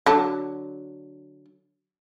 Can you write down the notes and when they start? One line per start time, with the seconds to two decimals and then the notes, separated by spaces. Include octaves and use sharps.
0.06 D3 F#3 A5